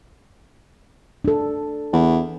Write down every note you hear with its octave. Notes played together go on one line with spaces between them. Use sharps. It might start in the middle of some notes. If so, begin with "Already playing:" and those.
D4 A4
E2